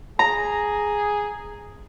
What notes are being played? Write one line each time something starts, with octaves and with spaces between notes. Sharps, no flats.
G#4 A#5